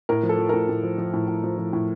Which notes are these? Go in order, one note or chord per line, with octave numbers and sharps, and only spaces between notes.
A2 A#4
F3
A4
F3
A2 A#4
A2
F3
F3
A2
A2
F3
F3
A2